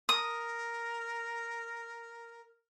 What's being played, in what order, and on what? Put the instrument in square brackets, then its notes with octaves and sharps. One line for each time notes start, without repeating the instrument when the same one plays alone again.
[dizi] A#4 [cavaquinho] D#6